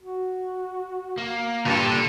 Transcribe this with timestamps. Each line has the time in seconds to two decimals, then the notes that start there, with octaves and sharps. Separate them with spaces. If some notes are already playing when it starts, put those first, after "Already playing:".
0.02 F#4
1.18 A#3
1.66 G2 A#2 D3 F4 A4